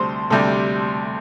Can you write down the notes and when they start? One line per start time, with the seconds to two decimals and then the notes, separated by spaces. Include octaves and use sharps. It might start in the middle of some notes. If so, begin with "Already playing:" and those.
Already playing: D2 C3 G3 A4 C5
0.30 D2 C3 G3 A4